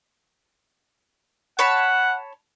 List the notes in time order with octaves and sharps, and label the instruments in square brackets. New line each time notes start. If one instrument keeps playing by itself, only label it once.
[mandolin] C#5 A5 B5 [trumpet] F#5